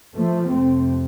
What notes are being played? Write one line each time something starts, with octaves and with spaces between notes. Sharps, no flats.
F3 A3
F2 C3 A3 C4